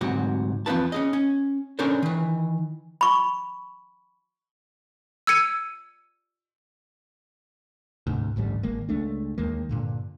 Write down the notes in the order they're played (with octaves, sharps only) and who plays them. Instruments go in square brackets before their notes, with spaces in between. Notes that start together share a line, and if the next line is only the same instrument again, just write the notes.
[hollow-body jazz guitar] D2 G#2 C3 F#3 F#4 G4
E2 F3 C4 D#4 B4 A5
C#4 G#4 D#5
C#4
C#4 D4 A4 A#4 C5 C#5
D#3 E3
[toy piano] B5 C#6
[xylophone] E6 G#6 C#7 D#7
[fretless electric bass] D2 G#2 C3
A1 D2 G#2 G3
G#1 D#3 G#3 A#3
C#2 G#3 A3 D4
D#2 D#3 G#3 A#3
G2 A#2 D3